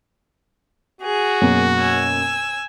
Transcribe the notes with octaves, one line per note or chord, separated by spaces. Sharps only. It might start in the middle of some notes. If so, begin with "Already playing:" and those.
F#4 G#4
F#2 B2 A#3
G#5 E6